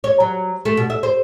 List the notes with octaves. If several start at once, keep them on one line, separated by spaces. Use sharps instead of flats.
C#5
F#3
A3
B2
E5
C5